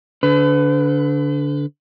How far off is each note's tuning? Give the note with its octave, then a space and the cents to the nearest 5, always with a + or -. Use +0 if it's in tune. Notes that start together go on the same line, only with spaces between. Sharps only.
D3 -20 B4 +35